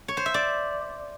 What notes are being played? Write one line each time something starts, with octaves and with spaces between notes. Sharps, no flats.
C#5
C5
E5
D5